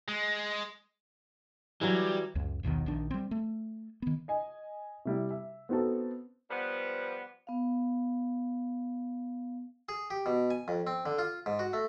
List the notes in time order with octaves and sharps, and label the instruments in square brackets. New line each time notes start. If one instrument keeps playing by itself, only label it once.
[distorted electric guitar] G#3
[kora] E3 F#3 [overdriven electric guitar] G3
[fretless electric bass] C#2 F#2
A#1 D#2 B2 D#3
A#1 D#3 D4
G3 C4
A3
D#3 B3
[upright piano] D#5 G#5
C3 G3 E4
E5
B3 C4 D#4 F#4 A4
[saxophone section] F3 G3 B3
[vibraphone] B3 F5
[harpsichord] G#4
G4
B2
G#5
F2
C4
D3
F4
G#2
F#4
A3